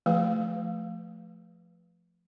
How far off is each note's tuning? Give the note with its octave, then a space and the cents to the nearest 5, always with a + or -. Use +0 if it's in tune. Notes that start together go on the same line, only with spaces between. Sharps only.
F3 +0 A3 +0 B4 +0